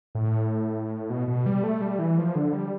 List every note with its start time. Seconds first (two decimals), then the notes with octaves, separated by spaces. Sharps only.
0.15 A2
1.10 B2
1.28 B2
1.46 G3
1.64 A3
1.81 G3
1.99 E3
2.18 F3
2.35 D3
2.53 G3